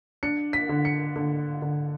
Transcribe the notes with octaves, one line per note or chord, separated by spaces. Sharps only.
D4 C#7
B6
D3
C#7
D3
D3